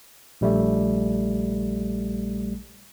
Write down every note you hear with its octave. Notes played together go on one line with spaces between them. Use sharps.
A#1 G3 A3